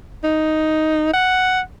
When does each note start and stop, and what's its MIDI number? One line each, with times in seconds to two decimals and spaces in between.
0.24 1.12 63
1.14 1.60 78